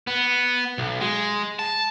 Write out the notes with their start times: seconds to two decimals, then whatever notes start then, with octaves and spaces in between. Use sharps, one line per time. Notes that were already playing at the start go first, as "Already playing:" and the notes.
0.07 B3
0.78 B1
1.01 G#3
1.59 A5